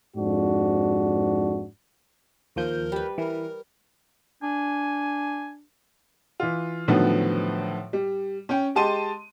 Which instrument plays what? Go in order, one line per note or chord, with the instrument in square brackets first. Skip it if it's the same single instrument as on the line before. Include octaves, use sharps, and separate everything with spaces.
[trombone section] F2 G#2 D4 F#4
[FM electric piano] D#2 F3 G6 [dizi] A#4
[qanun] G3 B4
[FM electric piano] E3 [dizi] A#4
[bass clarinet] D4 [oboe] G#5
[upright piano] E3 F4
A2 D3 D#3 F3 F#3 B3
G3
C#4 G5
G#3 G4 A5 C6 D#7